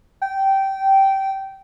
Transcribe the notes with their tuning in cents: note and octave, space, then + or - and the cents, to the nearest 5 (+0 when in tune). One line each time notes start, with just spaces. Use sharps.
G5 -15